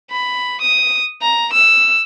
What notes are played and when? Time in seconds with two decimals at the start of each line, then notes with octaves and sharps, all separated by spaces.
0.11 B5
0.62 D#6
1.22 A#5
1.53 E6